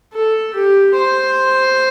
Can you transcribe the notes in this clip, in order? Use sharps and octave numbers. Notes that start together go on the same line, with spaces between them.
A4
G4
C5